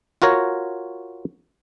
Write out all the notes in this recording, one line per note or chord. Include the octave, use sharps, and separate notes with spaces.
F4 F#4 A#4 C#5